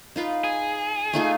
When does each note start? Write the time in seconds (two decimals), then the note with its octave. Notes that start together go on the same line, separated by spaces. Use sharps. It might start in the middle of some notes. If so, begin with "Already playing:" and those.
0.16 D#4 F4 B4
0.44 G#4
1.13 A3 D#4 F4